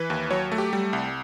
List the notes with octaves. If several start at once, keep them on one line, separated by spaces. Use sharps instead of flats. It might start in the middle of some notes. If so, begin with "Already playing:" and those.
Already playing: E3 B4
D#2
F#3 C#5
A3
G4
G3
C2